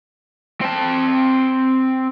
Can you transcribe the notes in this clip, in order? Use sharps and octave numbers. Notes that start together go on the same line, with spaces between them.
C4 A5